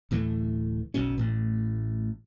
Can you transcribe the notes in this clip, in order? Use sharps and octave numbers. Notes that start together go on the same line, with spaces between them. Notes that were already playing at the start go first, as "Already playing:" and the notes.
D1 A2 E3 A3
F#1 B1 B2 C#4
A1 A2